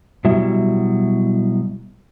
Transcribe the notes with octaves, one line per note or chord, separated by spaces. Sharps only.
B2 F#3 G3 E4 E5